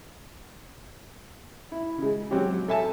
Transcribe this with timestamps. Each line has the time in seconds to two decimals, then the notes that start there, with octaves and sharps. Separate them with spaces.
1.72 E4
1.98 C#3 G#3
2.31 F#3 C4 C#4 G4
2.68 A4 E5 G#5 A5